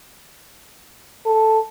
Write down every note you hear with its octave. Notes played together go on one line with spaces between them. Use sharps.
A4